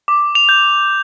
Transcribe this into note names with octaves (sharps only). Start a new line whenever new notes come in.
D6
F7
G6